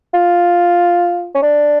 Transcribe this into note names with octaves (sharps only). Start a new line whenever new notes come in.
F4
C#4
D4